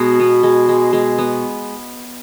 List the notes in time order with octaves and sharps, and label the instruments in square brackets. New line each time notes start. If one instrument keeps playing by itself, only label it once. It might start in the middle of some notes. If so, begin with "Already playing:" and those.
Already playing: [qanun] B2 G#3
B3
G#3
G#3
G#3
B3